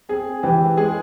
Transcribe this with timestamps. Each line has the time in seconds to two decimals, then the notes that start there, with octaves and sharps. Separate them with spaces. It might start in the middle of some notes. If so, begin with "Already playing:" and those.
0.09 C4 G#4
0.43 E3 G4
0.77 G#3 G#4